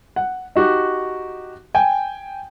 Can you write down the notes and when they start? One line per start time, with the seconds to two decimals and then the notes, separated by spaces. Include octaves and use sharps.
0.16 F#5
0.56 D#4 F#4 G4
1.75 G5 G#5